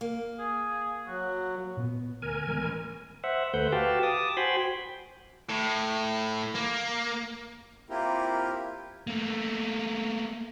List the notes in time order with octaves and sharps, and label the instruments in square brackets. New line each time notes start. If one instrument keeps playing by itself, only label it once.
[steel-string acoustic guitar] A#3
[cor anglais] G#4
[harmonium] F#3 [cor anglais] F#4
[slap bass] A#2 B3
[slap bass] D2 [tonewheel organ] A#4 G#5
[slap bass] E3 G#3 B3
A1
[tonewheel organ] C5 E5 F#5
D2 A3 B4 C5 F#5 G6
F#4 G4 B4 F5 G5 A5
A5 D6 D#6
F#4 C5 G5 G#5 B5 C6
[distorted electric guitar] A2
A#3
[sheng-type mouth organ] A#3 C4 E4 F4 G4 A#4
[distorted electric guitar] A3 A#3